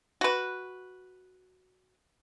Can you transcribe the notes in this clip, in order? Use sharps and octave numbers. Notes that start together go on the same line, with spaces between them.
F#4 B4